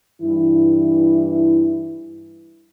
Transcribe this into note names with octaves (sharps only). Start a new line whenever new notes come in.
G2 E3 E4